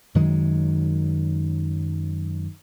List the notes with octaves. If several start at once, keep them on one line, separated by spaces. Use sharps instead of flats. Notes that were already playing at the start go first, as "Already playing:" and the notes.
F#2 D#3 F#3 G#3